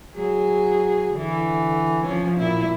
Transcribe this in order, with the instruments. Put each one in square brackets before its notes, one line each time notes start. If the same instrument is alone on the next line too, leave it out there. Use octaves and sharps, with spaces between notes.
[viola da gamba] F#3 G#4
D3 E3
F3 C#4
A#2 E4